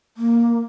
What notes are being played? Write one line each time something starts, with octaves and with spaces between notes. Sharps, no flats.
A#3